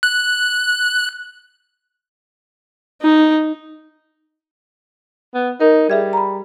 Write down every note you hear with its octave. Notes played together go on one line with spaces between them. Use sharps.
F#6
D#4
B3
D#4 A#4
G3 G#4 E5 G#6
A#5 B5